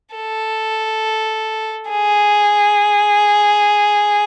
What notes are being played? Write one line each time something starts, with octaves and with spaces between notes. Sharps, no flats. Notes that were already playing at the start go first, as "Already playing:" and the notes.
A4
G#4